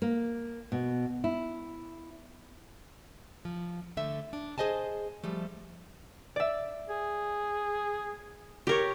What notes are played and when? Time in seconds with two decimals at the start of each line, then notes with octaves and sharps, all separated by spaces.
0.02 A#3
0.72 B2
1.24 E4
3.45 F3
3.97 D3 A3 E5
4.33 D4
4.58 G#4 C5 D#5 G#5 A5
5.24 F3 G3 A3
6.36 D5 E5
6.89 G#4
8.67 G4 A#4 C#5